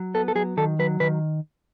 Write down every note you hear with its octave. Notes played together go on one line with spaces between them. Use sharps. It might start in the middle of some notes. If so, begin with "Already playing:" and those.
Already playing: F#3
B3 A4
A4
F#3 G#4
D#3 A4
F#3 B4
D#3 B4